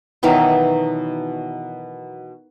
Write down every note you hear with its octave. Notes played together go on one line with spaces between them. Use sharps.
B2 D#3 E3 F#3